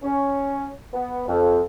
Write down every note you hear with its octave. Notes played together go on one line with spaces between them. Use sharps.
C#4
B3
F2